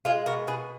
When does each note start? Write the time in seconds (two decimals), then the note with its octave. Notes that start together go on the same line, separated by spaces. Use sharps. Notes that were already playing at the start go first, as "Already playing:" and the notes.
0.05 G#3 F4 G#4
0.26 B2 F#4 A#4
0.47 B2 G#4 B4